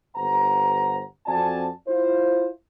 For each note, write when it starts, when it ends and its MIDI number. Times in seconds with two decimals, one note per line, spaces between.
0.16 1.01 31
0.16 1.01 43
0.16 1.01 72
0.16 1.01 78
0.16 1.01 82
1.26 1.68 41
1.26 1.68 60
1.26 1.68 66
1.26 1.68 74
1.26 1.68 80
1.26 1.68 81
1.87 2.48 64
1.87 2.48 65
1.87 2.48 72